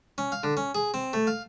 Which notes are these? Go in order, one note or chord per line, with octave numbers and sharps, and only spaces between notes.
C#4
F5
D3
C#4
G#4
C4
A3
F5